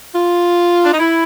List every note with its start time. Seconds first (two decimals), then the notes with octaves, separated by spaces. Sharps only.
0.14 F4
0.85 D4
0.92 D#4
1.00 E4